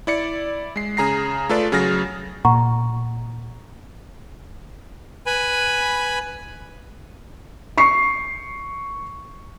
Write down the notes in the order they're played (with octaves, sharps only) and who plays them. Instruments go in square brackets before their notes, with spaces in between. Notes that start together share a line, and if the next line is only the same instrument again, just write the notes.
[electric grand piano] E4 D5 C#7
G#3 C7
C#3 G#4 A#5 A#6 C7
A3 F4 A4 B4 D5
C#3 F#3 G#4 F6 A6 A#6
[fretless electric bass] A#2 [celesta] F#5 A#5 C#6
[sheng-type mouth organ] B4 G#5 B5
[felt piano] C#6 C7